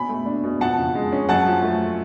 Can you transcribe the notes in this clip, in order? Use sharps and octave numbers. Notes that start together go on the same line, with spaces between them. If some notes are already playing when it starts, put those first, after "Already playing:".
Already playing: B2 C#4 G#5 B5
A3
D4
B2
F2 F#5 A5
C#3
G#3
C#4
F#2 F#5 A5
F3
A3